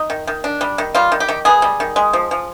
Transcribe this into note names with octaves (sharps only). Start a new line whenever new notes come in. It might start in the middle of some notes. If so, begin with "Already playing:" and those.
Already playing: D#4
D#3
D#3
D4
G3
D#3
G3 F4
D#3
G4
D#3
B3 G#4
G3
D#3
G#3
F3
F3